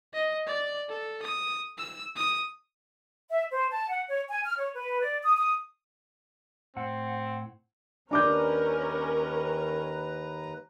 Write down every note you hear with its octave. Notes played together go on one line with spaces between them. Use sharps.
D#5
D5
A4
D#6
E6
D#6
E5
C5
A5
F#5
C#5
G#5
F6
C#5
B4
D5
D#6
D#6
A2 C4 F#5
D#2 C#4 D4 A#4 B4 A#5 D6 G6